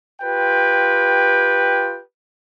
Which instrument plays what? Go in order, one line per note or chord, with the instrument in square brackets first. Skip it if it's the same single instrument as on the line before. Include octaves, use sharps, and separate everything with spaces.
[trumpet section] F4 G4 B4 G5